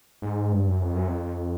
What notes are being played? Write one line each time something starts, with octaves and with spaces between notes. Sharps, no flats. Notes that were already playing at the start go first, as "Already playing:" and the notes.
G#2
G2
F#2
F2
F#2
F2